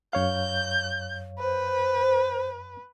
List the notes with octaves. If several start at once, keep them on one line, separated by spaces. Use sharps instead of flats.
F#2 C#5 F5 G6
B4 C5